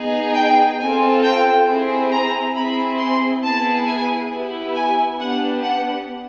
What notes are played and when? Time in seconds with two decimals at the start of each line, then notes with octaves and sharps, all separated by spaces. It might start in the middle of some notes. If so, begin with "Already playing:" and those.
Already playing: B3 D#4 G#4
0.35 G5
0.79 C4 F4 A4 G#5
1.23 G5
1.67 C4 E4 G#4
2.11 A#5
2.55 C4 E4 G#4 B5
2.99 C6
3.43 B3 E4 G#4 A5
3.88 G#5
4.31 B3 E4 G4
4.76 G#5
5.20 B3 D4 G4 F#5
5.63 F#5